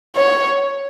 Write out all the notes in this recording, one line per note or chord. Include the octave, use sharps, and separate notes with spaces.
C#5